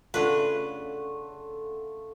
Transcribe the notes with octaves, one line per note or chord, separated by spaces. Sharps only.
C#3 A3 D4 F4 B4 F#5